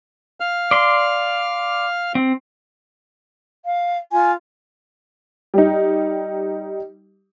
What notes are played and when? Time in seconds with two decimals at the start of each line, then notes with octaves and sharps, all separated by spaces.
0.40 F5 F6
0.71 D5 C6
2.15 C4
3.65 F5
4.12 F4 G#5
5.54 G3 D#4